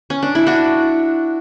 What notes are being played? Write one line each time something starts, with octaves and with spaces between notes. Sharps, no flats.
C#4
D4
E4
D4 F#4